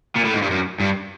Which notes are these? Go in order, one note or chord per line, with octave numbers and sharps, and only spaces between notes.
A#2
A2
G#2
G2
F#2
G2